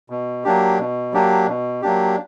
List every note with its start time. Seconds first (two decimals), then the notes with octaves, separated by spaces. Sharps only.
0.10 B2
0.44 F#3 A#3 D4 G4
0.79 B2
1.13 F#3 A#3 D4 G4
1.47 B2
1.82 F#3 A#3 D4 G4